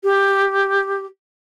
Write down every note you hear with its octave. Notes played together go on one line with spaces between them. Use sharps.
G4